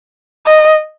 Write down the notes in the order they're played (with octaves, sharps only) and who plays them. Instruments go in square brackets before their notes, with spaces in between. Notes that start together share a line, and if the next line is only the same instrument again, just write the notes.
[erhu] D#5